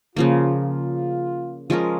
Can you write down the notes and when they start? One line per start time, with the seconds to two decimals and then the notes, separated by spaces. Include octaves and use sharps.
0.16 C#3 F3 A#3 F4
0.55 F4
1.70 F3 G#3 C#4 F4 A#4